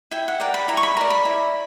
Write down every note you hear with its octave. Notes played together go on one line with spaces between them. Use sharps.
E4 G5
F#5
A#4 D5 G5
B5
E4 A#5
C#6
B5
A#4 D5 A#5
B5
E4